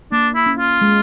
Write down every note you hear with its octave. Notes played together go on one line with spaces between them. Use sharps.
A#3 D4
E4
C#4
F4
G#3